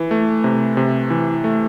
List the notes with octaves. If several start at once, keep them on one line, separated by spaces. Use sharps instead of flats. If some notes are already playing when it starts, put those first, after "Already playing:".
Already playing: E3
A3
C3
C3
E3
A3